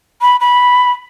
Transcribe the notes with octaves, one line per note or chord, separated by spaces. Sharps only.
B5
B5